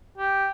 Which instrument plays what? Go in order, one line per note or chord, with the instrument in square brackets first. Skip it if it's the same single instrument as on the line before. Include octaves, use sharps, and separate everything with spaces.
[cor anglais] G4